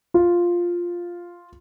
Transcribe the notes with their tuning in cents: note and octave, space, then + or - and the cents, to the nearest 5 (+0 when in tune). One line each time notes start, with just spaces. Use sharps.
F4 +0